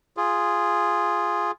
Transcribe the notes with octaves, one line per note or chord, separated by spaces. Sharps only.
F4 G#4